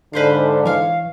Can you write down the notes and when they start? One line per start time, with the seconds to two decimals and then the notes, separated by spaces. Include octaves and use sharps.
0.13 G#2 D3 B4 C5 F5
0.65 E3 C#5 F5